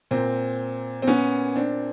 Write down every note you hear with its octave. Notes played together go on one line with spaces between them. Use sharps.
A#2 C4
C4
B3 C#4
C4 D4